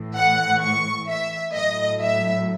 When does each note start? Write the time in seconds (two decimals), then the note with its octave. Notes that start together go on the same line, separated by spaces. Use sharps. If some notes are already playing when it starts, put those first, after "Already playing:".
Already playing: A2 E3
0.16 F#5
0.61 C#6
1.08 E5
1.53 A2 F#3 D#5
2.00 E5